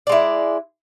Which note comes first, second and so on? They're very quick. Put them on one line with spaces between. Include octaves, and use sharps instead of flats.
D5 G#3 E4